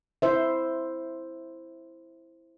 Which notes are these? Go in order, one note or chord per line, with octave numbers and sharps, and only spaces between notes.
E4 C5 E5